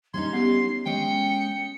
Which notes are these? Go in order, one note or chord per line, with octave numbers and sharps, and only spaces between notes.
G3 C#4 D#4 C6 G#6
B3 G4 C7
G#3 C#4 D#5 G5 C#7